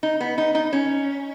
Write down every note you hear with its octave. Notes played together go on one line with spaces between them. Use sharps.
D#4
B3
D#4
D#4
C#4